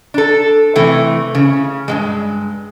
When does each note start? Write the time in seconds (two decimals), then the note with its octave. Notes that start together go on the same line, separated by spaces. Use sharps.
0.14 D4 A4
0.76 C3 E3 A3
1.35 C#3
1.88 G2 C#3 G#3